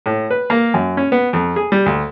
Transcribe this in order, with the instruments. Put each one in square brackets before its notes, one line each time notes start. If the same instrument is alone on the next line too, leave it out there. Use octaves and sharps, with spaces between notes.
[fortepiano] A2
B4
A#3
F#2
C#4
B3
F2
G#4
G3
D2